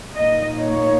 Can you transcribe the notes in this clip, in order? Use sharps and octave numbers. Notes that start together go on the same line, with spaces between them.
A#2 A#3 D#4 D#5
C#5